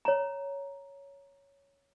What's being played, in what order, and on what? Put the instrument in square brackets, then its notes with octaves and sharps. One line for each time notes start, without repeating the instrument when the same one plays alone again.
[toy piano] C#5 A#5